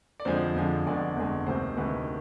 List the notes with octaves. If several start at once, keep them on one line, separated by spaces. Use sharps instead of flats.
D5
F2 D3 F3 G#3 C5
F2 D3 F3 G#3
G1 F2 D3 G#3 D5
G1 F2 D3 G#3
D2 C3 D#3 G#3 C5
D2 C3 D#3 G#3 B4